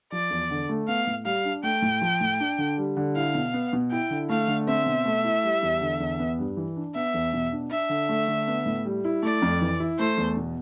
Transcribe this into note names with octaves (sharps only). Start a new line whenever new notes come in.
F3 D5
E2
D3
A3
B3 F5
A2
G3 F5
D4
A3 G5
A2
F3
A2
D4
D3
G3
D3
E4 F5
B2
B3
B2
E4 G5
D3
A3 F5
D3
C4 E5
B2
A3
E4
G3
E2
D3
E2
B3
G2
E3
D4
B3 E5
E2
B2
D4
D4 E5
D3
A3
D3
B3
A2
G3
E4
A3 D5
F2
E3
E4
A3 C5
E2
B2